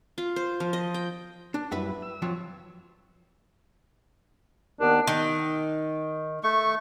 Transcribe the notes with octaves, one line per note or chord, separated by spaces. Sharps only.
F4
C5
F3
D#5
G5
D4
F#2 G3 E4 B4 E5 F#5
E6
F2 F3 F#3
D#2 D#3 B3 D4
D#3
A3 C#6